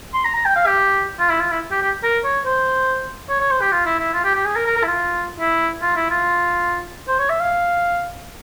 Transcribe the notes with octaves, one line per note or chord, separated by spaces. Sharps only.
C6
A#5
A#5
G5
F5
G4
F4
E4
F4
E4
G4
G4
A#4
C#5
C5
C#5
C#5
C5
G4
F4
E4
E4
F4
G4
G4
G#4
A#4
A#4
A#4
E4
F4
E4
F4
E4
F4
C5
C#5
E5
F5